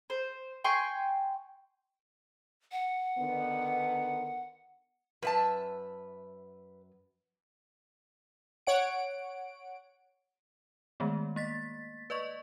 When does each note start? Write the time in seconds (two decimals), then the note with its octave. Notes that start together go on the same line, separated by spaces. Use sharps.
0.10 C5
0.64 G5 G#5 C6 C#6
2.72 F#5
3.18 D3 D#3 B3
5.23 F#2 B4 E5 A5
8.67 C#5 F#5 D7
11.00 D#3 G#3 A3 B3
11.36 A#3 A6 B6
12.10 B4 D5 D#5 C#6